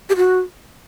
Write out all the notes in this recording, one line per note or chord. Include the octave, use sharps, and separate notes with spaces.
G4
F#4